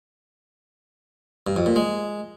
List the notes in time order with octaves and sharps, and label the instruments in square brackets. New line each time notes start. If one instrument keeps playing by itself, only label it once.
[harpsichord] G2
F2
A#2
G#3